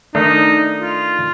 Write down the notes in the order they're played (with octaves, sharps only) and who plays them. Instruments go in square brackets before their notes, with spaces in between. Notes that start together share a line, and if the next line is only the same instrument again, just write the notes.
[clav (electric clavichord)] D#3 A3 D4 [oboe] D#4
[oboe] F4